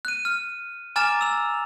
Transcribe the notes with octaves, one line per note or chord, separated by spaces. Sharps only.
F#6 D#7
F6
G#5 A#5 D6 F6 A6 E7
E6 F7